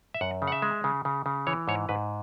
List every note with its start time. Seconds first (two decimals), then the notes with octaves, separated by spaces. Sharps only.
0.14 E5
0.21 F#2 F#5
0.42 C#3
0.47 F#5
0.52 E5
0.62 G#3
0.84 C#3
1.05 C#3
1.26 C#3
1.47 E3 C#5
1.68 G#2 C#5
1.89 G#2 B4